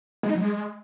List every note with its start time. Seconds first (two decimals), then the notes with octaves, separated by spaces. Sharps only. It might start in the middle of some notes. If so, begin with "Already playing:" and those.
0.23 G#3
0.29 D#4
0.35 F#3
0.41 G#3